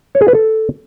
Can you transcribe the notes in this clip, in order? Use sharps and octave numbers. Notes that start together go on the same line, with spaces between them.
C#5
G#4
B4
A4